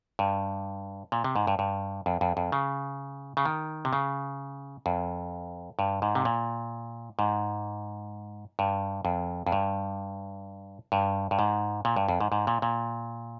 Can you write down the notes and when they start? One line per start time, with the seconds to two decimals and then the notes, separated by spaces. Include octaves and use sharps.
0.19 G2
1.12 A#2
1.24 C3
1.36 G#2
1.47 G2
1.59 G2
2.06 F2
2.21 F2
2.37 F2
2.52 C#3
3.37 C#3
3.45 D#3
3.85 C3
3.93 C#3
4.86 F2
5.79 G2
6.02 G#2
6.15 C3
6.25 A#2
7.19 G#2
8.59 G2
9.05 F2
9.47 F2
9.52 G2
10.92 G2
11.31 G2
11.39 G#2
11.85 A#2
11.96 G2
12.09 F2
12.20 G#2
12.32 G#2
12.47 A#2
12.62 A#2